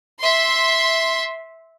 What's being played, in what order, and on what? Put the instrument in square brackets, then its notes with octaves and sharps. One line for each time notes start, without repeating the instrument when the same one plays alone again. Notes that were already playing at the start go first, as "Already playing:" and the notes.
[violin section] E5 C6